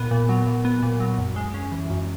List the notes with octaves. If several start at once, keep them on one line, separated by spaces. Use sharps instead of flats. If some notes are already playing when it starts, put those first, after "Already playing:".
Already playing: A#2 B3
A#2
F#3
A#2
B3
A#2
F#3
F#2
G#3
C#4
E3
F#2